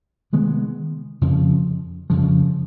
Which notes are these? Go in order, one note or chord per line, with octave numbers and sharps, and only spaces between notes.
C3 D#3 G#3 B3
F2 C#3 F3
F2 C#3 F3